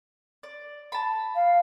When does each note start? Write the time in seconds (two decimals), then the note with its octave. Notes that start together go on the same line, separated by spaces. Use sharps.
0.43 D5
0.92 A5 B5
1.35 F5